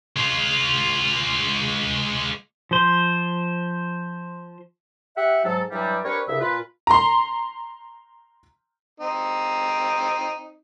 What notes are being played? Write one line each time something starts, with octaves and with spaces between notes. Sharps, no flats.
G#3 F4
F3 C5
G4 E5 F#5
G#2 F#3 A4
G2 E3 F#3 G3
C4 D4 G4 A#4 B4 C#5
C2 G2 C#3 E5
A#2 F4 B4
A#5 C6
C4 D#4